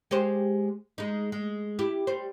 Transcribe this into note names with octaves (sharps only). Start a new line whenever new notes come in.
G#3 G4 C5
G#3 D#4
G#3
E4 G4
G3 C5